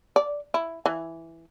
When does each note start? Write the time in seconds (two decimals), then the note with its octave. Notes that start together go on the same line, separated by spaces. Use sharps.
0.16 D5
0.54 E4
0.86 E3